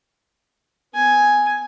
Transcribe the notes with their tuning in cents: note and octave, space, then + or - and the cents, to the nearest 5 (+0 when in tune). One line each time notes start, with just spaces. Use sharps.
B3 +35 G#5 +0